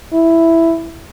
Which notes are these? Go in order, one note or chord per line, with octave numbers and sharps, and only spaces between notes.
E4